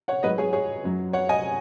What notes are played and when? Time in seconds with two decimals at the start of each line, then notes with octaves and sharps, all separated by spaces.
0.08 C#5 F#5
0.23 G#2 F#3 B4 D#5
0.38 G#4 C#5
0.53 G#4 C#5
0.83 F#2 F#3
1.13 C#5 F#5
1.29 D#5 G#5